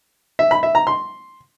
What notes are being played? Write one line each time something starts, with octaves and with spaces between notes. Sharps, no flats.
E5
B5
E5
A#5
C6